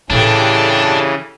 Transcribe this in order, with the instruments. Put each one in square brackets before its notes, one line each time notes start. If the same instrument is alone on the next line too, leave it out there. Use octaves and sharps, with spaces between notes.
[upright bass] A2 E4 [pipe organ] C#3 E3 [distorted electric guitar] D4 [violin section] G4 A4